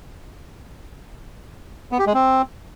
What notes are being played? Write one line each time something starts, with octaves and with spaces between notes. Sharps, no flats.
B3
G4
G#3
C4